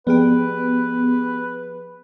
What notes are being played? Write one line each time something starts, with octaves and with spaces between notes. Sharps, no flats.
F3 B3 G4 G#4 B4 D7